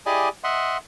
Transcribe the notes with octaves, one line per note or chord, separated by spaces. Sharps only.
E4 G4 G#4 D5 D#5 G#5
D#5 E5 F#5 C6